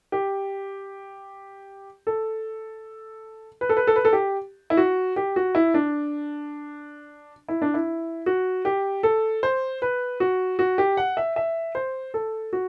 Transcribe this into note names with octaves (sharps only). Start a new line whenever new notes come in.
G4
A4
B4
A4
B4
A4
B4
A4
G4
E4
F#4
G4
F#4
E4
D4
E4
D4
E4
F#4
G4
A4
C5
B4
F#4
F#4
G4
F#5
E5
E5
C5
A4
F#4